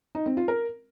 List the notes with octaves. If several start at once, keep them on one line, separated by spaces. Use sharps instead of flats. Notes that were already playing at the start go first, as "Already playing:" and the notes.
D#4
C4
F4
A#4